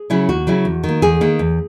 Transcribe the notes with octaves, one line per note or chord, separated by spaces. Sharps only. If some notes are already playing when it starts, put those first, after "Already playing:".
Already playing: G#4
C#3 F#3 C#4 E4
D#2 F#4
C#3 F#3 C#4 E4
E2
D#3
A#3
E2 G#4
D#3 A#3
E2